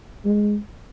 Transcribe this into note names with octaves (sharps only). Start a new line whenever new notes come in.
G#3